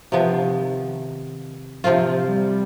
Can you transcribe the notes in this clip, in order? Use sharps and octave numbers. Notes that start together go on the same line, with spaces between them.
C3 D#3 F3 B3
C3 F3 C4 F4
G3